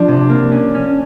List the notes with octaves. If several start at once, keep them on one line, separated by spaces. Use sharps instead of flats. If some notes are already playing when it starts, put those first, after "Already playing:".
Already playing: F3 D4
C3
A#3
C#4
C#4